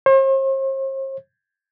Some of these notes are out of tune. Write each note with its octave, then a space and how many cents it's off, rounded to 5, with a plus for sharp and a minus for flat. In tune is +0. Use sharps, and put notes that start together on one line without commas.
C5 +45